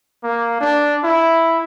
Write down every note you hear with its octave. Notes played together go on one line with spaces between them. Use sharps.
A#3
D4
E4